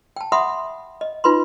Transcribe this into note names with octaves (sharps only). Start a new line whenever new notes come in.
G5 A5
E5 F#5 B5 C6 D#6
D#5
D#4 F4 B4 B5 C6